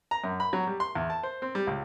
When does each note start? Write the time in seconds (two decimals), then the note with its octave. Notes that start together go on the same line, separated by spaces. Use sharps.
0.11 A#5
0.24 F#2
0.40 B5
0.53 F#3
0.67 G3
0.80 C6
0.95 E2
1.10 A5
1.23 C5
1.42 C4
1.55 G3
1.67 C#2